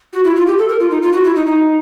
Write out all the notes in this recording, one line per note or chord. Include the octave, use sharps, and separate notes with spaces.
F#4
E4
F4
G4
A4
A#4
F4
D#4
F4
F#4
E4
D#4
D#4